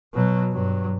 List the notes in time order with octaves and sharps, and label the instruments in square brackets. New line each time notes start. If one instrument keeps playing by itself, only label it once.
[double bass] B2 F#3
G2 F#3